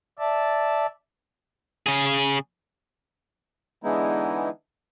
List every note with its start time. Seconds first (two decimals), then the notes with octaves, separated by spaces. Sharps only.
0.19 D5 E5 A5
1.86 C#3 G#4
3.83 D3 E3 G#3 B3 D#4 E4